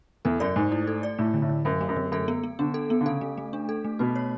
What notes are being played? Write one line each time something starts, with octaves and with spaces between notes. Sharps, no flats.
E2 A4
F#2 D5
G#2 A3
E4
A4
D5
A2 A3
D3
A2
D3
F#2 F#3
A3
F#2
D3
F#2 A4
B3
B3
D3 D4
A4
B3
D3
C#3 A4
A3
A3
D4
A4
A3
B2 F#4
C#5